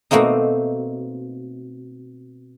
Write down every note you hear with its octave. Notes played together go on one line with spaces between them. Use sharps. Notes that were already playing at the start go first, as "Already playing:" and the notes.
B2 A3 A#3 C4 D#4